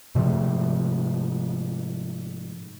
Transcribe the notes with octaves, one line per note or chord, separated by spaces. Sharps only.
G#2 C3 F3 A3